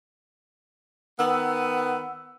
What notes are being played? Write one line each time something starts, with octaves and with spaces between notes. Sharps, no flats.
D#3 B3 F#5 E6